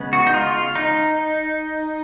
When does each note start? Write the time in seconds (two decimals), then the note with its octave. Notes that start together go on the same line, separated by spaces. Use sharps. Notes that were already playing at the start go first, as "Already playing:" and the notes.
Already playing: C#3 G#3 B3
0.13 F#4
0.27 D#4
0.34 F4
0.75 D#4